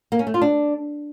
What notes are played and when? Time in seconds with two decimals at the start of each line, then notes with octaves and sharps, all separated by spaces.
0.12 A#3
0.19 C#4
0.27 A3
0.34 F4
0.42 D4